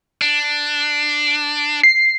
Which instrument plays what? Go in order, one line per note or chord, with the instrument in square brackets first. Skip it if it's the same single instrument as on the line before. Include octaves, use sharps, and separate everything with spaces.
[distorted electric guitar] D4
[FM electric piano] C7